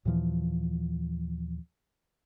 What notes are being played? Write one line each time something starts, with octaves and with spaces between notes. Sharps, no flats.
D#2 A#2 E3 F3